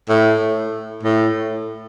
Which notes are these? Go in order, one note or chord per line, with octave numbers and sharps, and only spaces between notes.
A2
A2